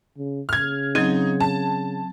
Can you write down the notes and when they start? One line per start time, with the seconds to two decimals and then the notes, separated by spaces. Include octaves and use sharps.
0.17 C#3
0.49 C#3 F6 G#6
0.95 F#3 C4 D#4 G#6
1.40 A5